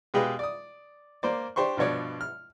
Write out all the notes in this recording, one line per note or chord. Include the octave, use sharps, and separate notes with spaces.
B2 G#3 G4 G#4 B4 F5
D5 D#6
A#3 C5 D5
D4 G4 C5 C6 C#6
G2 B2 F3 C#5 D5
F6